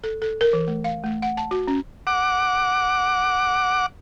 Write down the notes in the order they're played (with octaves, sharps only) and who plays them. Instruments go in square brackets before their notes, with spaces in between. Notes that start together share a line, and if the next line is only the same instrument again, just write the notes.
[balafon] A4
A4
A#4
E3
A3
F5
A3
F#5
A5
F#4
C#4
[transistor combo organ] F#5 D6